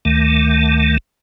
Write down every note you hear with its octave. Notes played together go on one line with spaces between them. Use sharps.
D2 D#3 A3